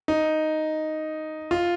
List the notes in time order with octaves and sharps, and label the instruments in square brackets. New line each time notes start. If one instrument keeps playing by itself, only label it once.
[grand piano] D#4
F4